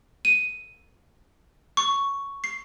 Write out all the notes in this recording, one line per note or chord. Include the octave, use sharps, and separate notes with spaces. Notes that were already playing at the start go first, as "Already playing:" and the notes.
D#7
C#6
C7